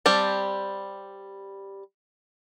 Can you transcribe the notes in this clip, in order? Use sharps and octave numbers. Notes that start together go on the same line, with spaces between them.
G3 C4 G4 A5